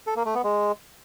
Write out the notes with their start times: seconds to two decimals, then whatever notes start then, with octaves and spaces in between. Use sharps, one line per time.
0.07 A4
0.16 A#3
0.25 A3
0.35 B3
0.44 G#3